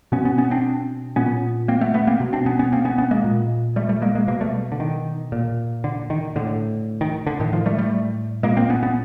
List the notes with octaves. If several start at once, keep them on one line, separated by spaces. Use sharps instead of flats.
B2 B3 C#4
B3 C#4
B3 C#4
C4 D4
A#2 B3 C#4
A#3 C4
A3 B3
A3 B3
A#3 C4
B2
C4 D4
B3 C#4
B3 C#4
A#3 C4
B3 C#4
B3 C#4
G#3 A#3
A#2
G3 A3
G3 A3
G#3 A#3
G#3 A#3
B2 G#3 A#3
G3 A3
D3
D#3
A#2
D3
D#3
A2 D3
D#3
D3
A2 D#3
D#3 F3
G3 A3
G3 A3
A#2 G#3 A#3
A#3 C4
B3 C#4
B3 C#4